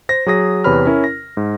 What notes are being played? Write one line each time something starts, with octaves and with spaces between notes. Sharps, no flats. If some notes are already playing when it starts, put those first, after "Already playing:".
C5 A#6
F#3 G#4 D#6 A#6
E2 C3 B4 C#5 B5 F6
C#4 E4 A#4
A#6
G#2